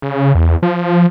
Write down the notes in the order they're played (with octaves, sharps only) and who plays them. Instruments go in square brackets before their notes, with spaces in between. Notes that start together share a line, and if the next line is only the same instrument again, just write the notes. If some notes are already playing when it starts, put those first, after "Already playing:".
[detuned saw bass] C#3
E2
F3